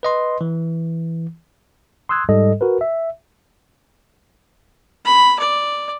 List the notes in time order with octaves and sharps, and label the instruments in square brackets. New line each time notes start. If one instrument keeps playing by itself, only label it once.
[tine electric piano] B4 D#5 C6
E3
C6 D#6 E6 F#6 G#6
G#2 G3 A4 D#5
F#4 A#4 B4
E5
[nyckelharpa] B5
D5